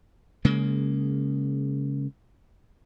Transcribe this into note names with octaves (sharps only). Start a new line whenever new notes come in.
C#3 G#3 A#3